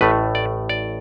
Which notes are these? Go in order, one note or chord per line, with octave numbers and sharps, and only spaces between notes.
A1 A2 A3 B4
D5
D5